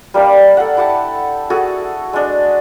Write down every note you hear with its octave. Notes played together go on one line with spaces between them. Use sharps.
G3 A#3 D4 G4
A4 F#5
E4 G4 F#5 A5
F#4 G#4 A4
G#3 D4